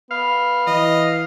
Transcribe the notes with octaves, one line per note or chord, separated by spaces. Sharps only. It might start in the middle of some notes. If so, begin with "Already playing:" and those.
B3 F5
E3 D#5